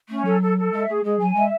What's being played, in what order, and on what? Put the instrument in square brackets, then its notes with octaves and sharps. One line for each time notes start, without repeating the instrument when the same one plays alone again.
[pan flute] A3 [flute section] C#4
[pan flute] F#3 [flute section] A4
[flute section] A4
A4
[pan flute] G#3 [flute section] E5
[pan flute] A3 [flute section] G#4
[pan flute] G#3 [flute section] G#4
[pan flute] F#3 [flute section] G#5
[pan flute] G#3 [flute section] E5